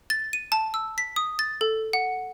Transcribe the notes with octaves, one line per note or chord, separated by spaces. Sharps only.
A6
D#7
A5
E6
B6
D#6
A6
A4
F#5